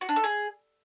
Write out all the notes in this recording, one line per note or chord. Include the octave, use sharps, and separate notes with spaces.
F#4
D4
A4
G#4